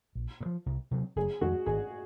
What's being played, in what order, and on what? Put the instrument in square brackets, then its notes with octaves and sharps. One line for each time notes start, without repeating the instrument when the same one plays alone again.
[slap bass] A#1
A#2
F3
C2
C3 F#3 C4
[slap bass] F#1 [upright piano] G#4
[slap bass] F2 D#3 G#3 [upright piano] F#4
[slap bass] G#1 [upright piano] G#4